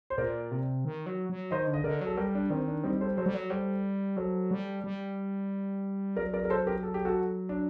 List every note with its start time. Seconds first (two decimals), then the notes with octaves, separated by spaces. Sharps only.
0.10 C5
0.18 A#2 A#4 D5
0.51 C3
0.85 D#3
1.06 F#3
1.30 F#3
1.51 D#3 C5 D#5
1.67 D3
1.74 D#5
1.84 D3 A#4 D5
2.01 F#3
2.07 A4
2.17 G3 G4 A#4
2.35 D4
2.50 D#3 C4
2.68 D4
2.84 G3 C4 D#4
3.01 A4 C5
3.17 F#3 A4 C5
3.26 G3
3.34 F#3
3.50 G3 A4 C5
4.17 F#3 A4 C5
4.51 G3
4.84 G3
6.16 F#3 A#4 D5
6.33 A#4 D5
6.45 A#4
6.50 A4 C5
6.67 G4 A#4
6.83 A4
6.94 G4
7.05 F#4 A4
7.49 D4